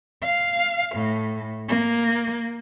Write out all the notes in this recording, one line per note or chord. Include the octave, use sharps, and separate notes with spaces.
F5
A2
A#3